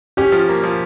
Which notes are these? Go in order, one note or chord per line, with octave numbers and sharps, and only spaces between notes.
C#4 G4
F3
A#3
F3